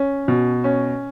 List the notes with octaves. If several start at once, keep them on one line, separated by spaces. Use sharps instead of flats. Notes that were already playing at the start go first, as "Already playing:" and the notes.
Already playing: C#4
B2
C#4